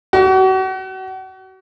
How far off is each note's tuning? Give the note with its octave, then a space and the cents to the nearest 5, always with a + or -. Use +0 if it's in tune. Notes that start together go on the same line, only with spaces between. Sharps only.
F#4 +35